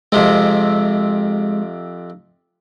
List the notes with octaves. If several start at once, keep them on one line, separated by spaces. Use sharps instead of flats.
F2 C3 G#3 C4